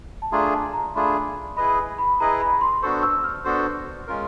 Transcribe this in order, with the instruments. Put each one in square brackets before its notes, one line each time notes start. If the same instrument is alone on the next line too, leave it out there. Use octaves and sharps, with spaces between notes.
[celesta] A5
[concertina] A3 D4 F4 G#4 [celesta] A#5
[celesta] A5
A#5
[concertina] A3 D4 F4 G#4 [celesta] B5
[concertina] E4 G#4 B4 D#5 [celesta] B5
[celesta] B5
[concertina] E4 G#4 B4 D#5 [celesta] A#5
[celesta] B5
C6
[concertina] B3 D4 F#4 A4 C5 [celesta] C#6
[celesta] E6
F6
[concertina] B3 D4 F#4 A4 C5
G#3 C#4 F4 A#4